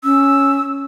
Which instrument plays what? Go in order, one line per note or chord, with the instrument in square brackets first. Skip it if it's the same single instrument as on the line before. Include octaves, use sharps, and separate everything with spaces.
[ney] C#4 [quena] E6